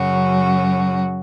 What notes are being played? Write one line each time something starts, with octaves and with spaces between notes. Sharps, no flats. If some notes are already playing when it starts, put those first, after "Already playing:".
Already playing: F#2 C#3 F#3 C#4 F#4